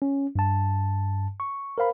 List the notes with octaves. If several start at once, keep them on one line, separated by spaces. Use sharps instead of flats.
C#4
G2 A5
C#6
A#4 C5 F5 B5